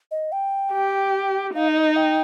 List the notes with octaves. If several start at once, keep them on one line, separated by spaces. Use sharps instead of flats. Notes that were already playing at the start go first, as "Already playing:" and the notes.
D#5
G5
G4
D#4 F5
D#5
D#5
G5